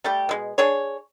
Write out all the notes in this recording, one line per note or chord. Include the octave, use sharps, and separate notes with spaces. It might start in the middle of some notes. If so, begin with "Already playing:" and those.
G3 A3 G4
B2 G#3
D4 G#4 C#5